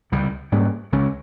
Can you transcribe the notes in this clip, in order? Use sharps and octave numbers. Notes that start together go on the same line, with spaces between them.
C#2 C3 G3
G#2 G3 A#3 C#4
C#2 C#3 G#3 C#4